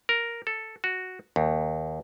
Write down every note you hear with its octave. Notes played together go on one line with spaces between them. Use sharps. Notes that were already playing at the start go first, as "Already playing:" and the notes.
A#4
A4
F#4
D#2